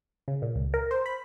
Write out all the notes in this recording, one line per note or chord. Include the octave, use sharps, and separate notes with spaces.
C#3
A#2
C#2
A#4
C5
B5